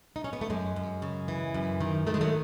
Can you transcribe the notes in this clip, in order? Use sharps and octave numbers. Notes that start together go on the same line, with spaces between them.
D#4
C#4
B3
A3
F#2 G#3
F#2
C#3
E3
F#2
D#3
D#3 A3
G#3
F#3 A3